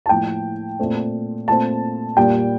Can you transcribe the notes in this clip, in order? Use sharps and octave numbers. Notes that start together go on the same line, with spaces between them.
A5
A2 F3 A#3 G5
A#2 A3 C4
A#2 A3 C4 A5
A#2 G3 A#3 G5